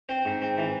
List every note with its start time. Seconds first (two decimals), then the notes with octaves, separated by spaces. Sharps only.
0.09 C4 C5
0.25 G#2
0.42 C4
0.57 E3